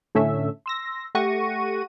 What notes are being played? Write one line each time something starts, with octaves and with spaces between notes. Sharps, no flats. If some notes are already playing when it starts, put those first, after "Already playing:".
A2 D3 A3 C#4 A4 E5
C6 E6 A#6
A3 G4 F#5 C#6 A#6 D#7